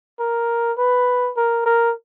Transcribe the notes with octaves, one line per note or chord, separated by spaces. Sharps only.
A#4
B4
A#4
A#4